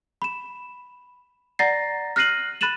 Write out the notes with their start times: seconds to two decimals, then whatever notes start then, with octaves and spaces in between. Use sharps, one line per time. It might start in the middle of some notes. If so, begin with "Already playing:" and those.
0.22 B5 E7
1.59 D5 F#5 A#5 A6 A#6 C7
2.16 F6 F#6 A#6 C7 D#7 F#7
2.61 B5 F#6 A6 D#7 E7 F#7